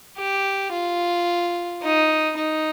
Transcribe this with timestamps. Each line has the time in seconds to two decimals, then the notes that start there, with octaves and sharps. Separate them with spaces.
0.18 G4
0.73 F4
1.83 D#4
2.37 D#4